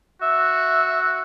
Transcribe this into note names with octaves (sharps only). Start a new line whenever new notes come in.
F#4 E5